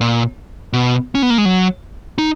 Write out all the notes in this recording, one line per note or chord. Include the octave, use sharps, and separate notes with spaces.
A#2
B2
C#4
B3
A#3
G#3
F#3
D#4